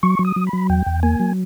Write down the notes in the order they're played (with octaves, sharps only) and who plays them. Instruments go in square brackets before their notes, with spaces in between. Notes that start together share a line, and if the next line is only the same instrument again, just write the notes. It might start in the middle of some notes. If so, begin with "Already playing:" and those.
[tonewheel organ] F#3 C#6
F#3
D#6
F#3
B5
F#3
E2 G5
E2
A#3 G#5
F#3